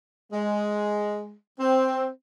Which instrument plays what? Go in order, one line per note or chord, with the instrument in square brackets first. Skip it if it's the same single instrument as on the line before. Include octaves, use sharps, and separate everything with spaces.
[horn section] G#3
C4